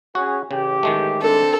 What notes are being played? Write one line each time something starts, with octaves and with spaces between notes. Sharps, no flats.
C#4 F#4 G#4
A1 C#3 G4
D#3 G#3 A3
C4 D4 A4